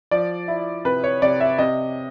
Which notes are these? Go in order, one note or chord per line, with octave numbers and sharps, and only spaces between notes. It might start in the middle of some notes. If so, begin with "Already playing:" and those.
F3 D5
E4
C3 B4
C#5
C3 D5
E5
C3 D#5